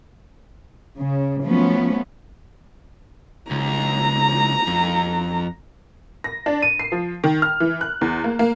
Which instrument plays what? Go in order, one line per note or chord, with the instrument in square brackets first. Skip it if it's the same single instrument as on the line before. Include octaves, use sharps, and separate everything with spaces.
[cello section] C#3
F3 F#3 A3 B3 C#4
[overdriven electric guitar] C#2 [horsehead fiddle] A#5
[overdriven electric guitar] F2
[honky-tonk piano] A#6
D4
D#7
C7
F3
D#3
F6
E3
F#6
E2
A#3
A#3